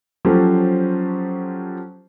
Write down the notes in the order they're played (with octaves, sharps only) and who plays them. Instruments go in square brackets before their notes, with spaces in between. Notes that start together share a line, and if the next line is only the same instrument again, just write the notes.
[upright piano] F3 F#3 C#4 G4 A4 C5